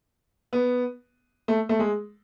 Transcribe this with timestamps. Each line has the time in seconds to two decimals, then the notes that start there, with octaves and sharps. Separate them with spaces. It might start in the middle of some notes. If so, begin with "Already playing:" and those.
0.53 B3
1.48 A3
1.69 A3
1.79 G#3